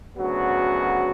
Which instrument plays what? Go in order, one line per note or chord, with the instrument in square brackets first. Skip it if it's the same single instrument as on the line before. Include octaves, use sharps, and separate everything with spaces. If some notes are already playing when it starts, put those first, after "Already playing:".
[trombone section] D2 C#3 F#3 B3 F#4